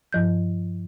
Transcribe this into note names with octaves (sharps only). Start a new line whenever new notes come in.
G2 F3 G6